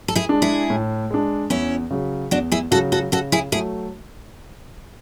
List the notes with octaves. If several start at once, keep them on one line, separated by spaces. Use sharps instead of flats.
A4
E4 G#4
G#3 D4
E4 G#4
A2
G#3 D4
E2 C#4 E4
C#3 F#3
E2 D4 F#4
E4 G#4
C#3 F#3 F#4 A4
F#4 A4
C#3 F#4 A4
E4 G#4
F#3 A3 E4 G#4